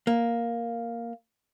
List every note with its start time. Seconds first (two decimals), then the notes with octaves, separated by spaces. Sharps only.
0.07 A#3